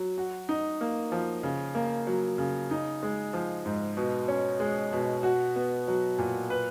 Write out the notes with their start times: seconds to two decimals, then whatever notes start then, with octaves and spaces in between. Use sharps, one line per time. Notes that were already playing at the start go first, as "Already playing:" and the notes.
Already playing: F#3
0.18 F#4
0.49 D#4
0.81 A#3
1.12 F3
1.43 C#3
1.75 A#3
2.07 F#3
2.38 C#3
2.71 D#4
3.03 G#3
3.33 F3
3.65 G#2
3.97 B2
4.28 C#4
4.60 G#3
4.93 B2
5.23 F#4
5.56 B3
5.88 F#3
6.18 A#2
6.50 B4